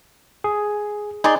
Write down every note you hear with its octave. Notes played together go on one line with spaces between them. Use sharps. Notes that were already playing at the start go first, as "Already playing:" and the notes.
G#4
D#4 G#4 D5 C6